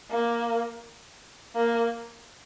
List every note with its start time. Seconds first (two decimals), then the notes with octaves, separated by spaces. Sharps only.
0.11 A#3
1.56 A#3